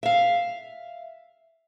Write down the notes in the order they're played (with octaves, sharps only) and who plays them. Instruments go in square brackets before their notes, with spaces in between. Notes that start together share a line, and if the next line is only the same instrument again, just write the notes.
[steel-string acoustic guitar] E5 F5